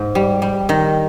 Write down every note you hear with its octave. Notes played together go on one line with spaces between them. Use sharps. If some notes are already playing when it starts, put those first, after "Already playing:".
Already playing: G#2
G3
G3
D#3